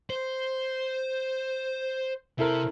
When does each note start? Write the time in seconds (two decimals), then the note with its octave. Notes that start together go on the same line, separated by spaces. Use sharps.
0.10 C5
2.39 C3 E4 A4 A#4